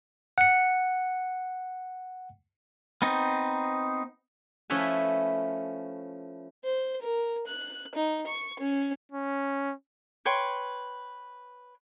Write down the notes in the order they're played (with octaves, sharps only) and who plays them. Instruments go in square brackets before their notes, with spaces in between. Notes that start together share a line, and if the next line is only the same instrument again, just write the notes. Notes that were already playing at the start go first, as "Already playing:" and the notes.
[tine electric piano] F#5 C#7
[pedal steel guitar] B3 C4 D#4
[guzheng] F3 A3 C#4 E4 B4 G#5
[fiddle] C5
A#4
F#6
D#4
C#6
C#4
[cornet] C#4
[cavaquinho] B4 C#5 G5 C6